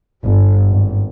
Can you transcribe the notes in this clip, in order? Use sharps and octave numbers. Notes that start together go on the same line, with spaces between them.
G1
G#1